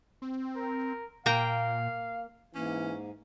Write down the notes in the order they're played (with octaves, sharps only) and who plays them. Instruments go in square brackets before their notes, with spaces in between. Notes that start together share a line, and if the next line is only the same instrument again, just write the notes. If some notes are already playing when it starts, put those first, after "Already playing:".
[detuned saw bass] C4
[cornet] A#4
[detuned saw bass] A#2 [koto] A#3 G5 A#5 [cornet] F5
[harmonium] G#2 [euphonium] E3 [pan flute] A#3 [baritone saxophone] C#4